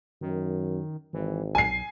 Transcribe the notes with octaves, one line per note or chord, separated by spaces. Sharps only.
F#2 D#3
G#1 E3
B1 G#5 C7